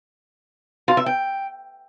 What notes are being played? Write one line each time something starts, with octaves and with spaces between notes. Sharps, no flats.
F4
E5
G5